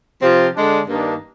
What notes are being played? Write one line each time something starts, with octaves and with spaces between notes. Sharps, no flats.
C3 F3 C4 F4
D3 G#3 D4
G2 D#3 A#3 D4